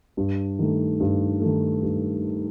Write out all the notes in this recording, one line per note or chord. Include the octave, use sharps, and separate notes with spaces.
G2
D#3 A3
G2
D#3 A3
G2